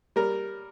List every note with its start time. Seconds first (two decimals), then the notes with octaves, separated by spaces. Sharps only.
0.16 G3 A#4